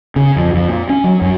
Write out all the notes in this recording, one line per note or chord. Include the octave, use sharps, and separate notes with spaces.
C#3
F2
F2
A#2
C#4
F#3
F#2